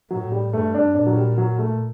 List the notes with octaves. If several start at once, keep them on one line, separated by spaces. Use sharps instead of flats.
A2 F#3
G3
G2 A3
D4
A#2 D4
F#3
G3
F#3
A3